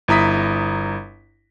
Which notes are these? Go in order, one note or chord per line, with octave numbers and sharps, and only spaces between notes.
G1 E4 A#5 D#6 B6